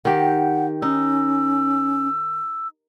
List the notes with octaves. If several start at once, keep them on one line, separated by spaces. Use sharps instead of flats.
D#3 G4 F#5
C#4 D#4 E6